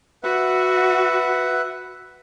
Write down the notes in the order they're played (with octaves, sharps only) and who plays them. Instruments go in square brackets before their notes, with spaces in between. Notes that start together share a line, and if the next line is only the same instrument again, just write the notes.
[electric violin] F#4 [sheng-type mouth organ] B4 E5 F#5